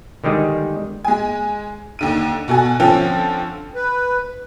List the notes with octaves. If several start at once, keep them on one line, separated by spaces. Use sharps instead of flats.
D3 D#3 G3 G#3 G#4
G#3 G#5
D#2 D3 D#7
B2 F#4 A4 G#5
D3 F3 C4 C#4 A4
B4